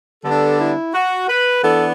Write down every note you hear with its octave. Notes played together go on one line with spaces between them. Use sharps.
D3 G3 B3 D4 A4
E4
F#4
B4
E3 B3 D4 A4